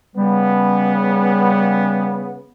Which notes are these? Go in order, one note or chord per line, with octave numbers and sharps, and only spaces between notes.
C#3 G3 B3